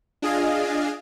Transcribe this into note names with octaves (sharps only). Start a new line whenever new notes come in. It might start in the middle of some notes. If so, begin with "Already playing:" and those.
D4 F4 G#4 D#5 F5 G#5